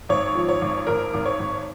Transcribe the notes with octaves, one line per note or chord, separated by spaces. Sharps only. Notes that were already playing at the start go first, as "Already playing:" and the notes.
G#1 C#5
F3
C#5
G#1
G#1 A#4
G#1
C#5
G#1